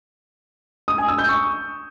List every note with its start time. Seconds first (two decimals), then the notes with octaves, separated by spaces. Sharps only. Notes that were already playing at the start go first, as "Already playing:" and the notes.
0.88 D#6
0.98 G#5
1.08 E6
1.18 G6
1.29 C#6